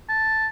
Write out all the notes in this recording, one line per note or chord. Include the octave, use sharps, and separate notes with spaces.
A5